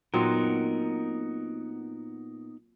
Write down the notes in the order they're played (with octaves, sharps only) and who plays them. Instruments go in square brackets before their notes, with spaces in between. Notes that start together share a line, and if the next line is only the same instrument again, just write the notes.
[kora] A#2 F#3 C4 [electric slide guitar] B3 D#4 A#4